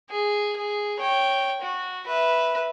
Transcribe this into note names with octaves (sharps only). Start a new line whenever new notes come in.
G#4
G#4
C#5 G5
F#4
B4 E5